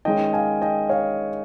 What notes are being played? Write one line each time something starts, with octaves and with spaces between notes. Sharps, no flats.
D#3 G#3 C#4 D#5 G5
F5 G#5
D#5 G5
C#5 F5